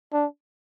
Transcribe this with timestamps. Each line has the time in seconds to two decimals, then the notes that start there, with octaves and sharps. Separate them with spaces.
0.13 D4